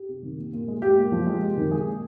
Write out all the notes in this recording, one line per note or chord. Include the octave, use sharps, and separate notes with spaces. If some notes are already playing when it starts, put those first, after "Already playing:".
Already playing: G4
C3
D#3
A#2
A#2
G#3
G#3 G4
A#2
F3
G#3
C3
D#3
G#3 G#4
A#2